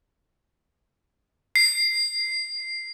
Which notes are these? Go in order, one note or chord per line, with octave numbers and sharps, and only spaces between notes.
C7